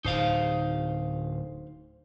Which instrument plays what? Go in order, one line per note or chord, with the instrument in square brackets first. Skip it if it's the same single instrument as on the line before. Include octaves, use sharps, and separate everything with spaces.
[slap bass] D1 [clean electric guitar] D#4 C5 F5